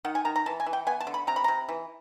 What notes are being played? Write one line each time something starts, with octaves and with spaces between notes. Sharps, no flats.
D#3 F#5
G#5
D#3 A#5
A#5
E3 A5
G#5
E3
G5
B3 G#5
A5
D3
B5
C3 A#5
B5
C3 A#5
E3